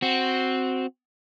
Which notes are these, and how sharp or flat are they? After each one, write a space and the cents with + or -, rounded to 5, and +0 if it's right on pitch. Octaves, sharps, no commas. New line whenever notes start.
C4 +0 F#4 +0